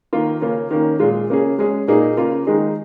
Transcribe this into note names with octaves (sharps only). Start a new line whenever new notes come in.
D#3 A#3 F4
C#3 A#3 C#4 F4
D#3 A#3 C#4
A#2 G#3 F4 G#4
C#3 A#3 C#4 G#4
G#3 C#4 G#4
A#2 A#3 D#4 G#4
C#3 A#3 F4
D#3 G#3 D#4 G#4